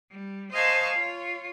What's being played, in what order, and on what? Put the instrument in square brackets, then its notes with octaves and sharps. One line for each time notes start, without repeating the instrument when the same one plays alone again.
[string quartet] G3
C5 D#5 F5 G#5 A5 C#6
F4 C#5